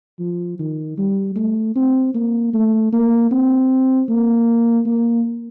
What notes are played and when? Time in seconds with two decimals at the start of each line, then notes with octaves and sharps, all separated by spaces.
0.20 F3
0.59 D#3
0.98 G3
1.36 A3
1.76 C4
2.14 A#3
2.54 A3
2.93 A#3
3.31 C4
4.09 A#3
4.86 A#3